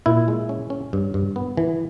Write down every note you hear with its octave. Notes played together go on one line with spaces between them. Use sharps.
A#2 E4
G#3
C#4
C#4
G2
G2
B3
E3